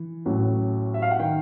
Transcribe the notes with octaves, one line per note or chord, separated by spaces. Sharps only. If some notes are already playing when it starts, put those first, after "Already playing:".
Already playing: E3
A1 A2 F#3
E5
F5
F#5
D#3 G5